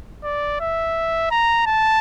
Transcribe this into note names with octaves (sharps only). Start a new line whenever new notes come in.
D5
E5
A#5
A5